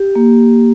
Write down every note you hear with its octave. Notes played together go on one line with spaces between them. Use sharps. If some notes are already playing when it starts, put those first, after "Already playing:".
Already playing: G4
A#3